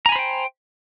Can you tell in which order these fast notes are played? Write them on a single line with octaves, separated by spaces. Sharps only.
A#5 G#5 B5 C5 G5